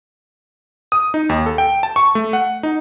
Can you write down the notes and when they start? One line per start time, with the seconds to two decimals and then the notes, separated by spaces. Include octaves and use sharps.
0.92 D#6
1.14 D#4
1.29 D#2
1.46 A4
1.58 G5
1.83 A5
1.96 C#6
2.15 A3
2.33 F#5
2.63 D#4